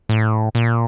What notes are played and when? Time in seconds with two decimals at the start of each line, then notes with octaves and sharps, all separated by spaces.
0.09 A2
0.55 A#2